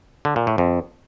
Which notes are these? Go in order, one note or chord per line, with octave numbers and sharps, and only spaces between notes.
D3
A#2
A2
F2